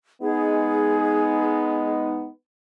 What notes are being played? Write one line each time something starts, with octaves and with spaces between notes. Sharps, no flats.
G#3 B3 D#4 G#4